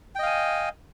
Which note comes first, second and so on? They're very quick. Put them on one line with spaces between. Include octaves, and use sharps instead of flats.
G5 D#5 F5 G#5